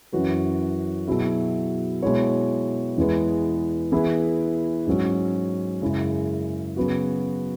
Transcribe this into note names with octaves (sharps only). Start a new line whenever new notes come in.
F#2 E3 C#4 F#4 B4
B2 F#3 E4 G#4 E5
B2 G#3 E4 C#5
E2 E3 G#3 B3
E3 B3 E4 G#4 B4
G#2 F#3 C#4
F#2 C#3 G#3 E4
C#3 F#3 B3 F#4